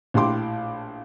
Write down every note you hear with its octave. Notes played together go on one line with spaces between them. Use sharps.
A#1 A2 E4 G4 C6 D6